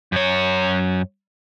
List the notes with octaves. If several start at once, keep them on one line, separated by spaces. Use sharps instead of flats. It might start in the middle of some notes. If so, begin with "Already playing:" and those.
F#2 C#5